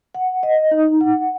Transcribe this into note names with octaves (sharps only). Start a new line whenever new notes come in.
F#5
D#5
D#4
F#5